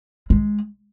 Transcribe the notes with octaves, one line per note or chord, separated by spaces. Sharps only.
G#3